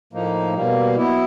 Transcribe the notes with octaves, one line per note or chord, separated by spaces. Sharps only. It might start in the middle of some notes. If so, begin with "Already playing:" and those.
A2 F3 A#3 D#4
B2 G3 A#3
F#3 B3 E4